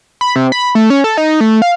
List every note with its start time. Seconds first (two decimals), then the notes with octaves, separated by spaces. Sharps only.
0.21 B5
0.36 C3
0.52 B5
0.75 A3
0.90 C#4
1.04 A4
1.17 D#4
1.41 A3
1.62 F5